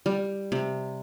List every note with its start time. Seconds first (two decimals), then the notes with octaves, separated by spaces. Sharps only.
0.06 G3
0.52 C3